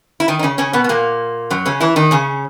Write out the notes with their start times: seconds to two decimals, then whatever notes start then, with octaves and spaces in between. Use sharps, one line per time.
0.20 E4
0.28 D#3 D#4
0.39 D#4
0.43 C#3 C#4
0.58 C#3 C#4
0.73 B2 B3
0.84 B3
0.89 A#2 A#3
1.50 F#2 F#3
1.65 C#3 C#4
1.80 E3 E4
1.96 D#3 D#4
2.11 C#3 C#4